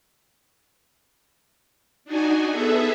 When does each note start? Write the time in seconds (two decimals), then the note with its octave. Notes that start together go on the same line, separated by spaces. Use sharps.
2.05 D4 D#4 F#4 G#5
2.51 B3 G#4 A4 E5